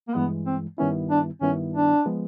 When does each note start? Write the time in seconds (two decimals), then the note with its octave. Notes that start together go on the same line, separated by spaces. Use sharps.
0.08 A#3
0.15 G2 E3 G#3 B3
0.46 C4
0.78 G2 D#3 G3 B3 C#4 E4
1.10 D4
1.42 G2 D#3 G3 B3 C#4 E4
1.73 D4
2.06 F3 G#3 B3